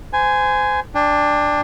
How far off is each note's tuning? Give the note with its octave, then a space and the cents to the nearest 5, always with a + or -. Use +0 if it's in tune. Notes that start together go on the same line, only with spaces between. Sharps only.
C5 -30 G#5 +0
D4 +5 G5 +40